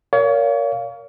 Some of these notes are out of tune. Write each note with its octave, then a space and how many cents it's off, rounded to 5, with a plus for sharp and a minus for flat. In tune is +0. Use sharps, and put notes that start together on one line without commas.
A#4 +0 C#5 +35 F5 +0